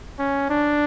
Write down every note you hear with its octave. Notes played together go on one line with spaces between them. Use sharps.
C#4
D4